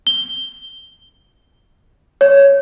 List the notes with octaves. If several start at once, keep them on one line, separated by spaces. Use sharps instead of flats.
G7
C#5